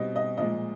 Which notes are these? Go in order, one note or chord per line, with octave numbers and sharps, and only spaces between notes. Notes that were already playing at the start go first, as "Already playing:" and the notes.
Already playing: B2 G3 C4 D#5
D#5
A#2 F3 G#3 D#5